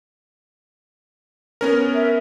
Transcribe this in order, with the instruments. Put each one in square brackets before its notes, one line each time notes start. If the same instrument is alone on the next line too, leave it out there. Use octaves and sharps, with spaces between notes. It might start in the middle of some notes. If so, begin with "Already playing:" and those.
[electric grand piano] B3 C#4 A#4
[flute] E5